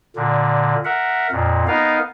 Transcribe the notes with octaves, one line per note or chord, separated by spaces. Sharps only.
A#2 D3
A#4 E5 F#5
F2 A#2
B3 D#4 A#4 F5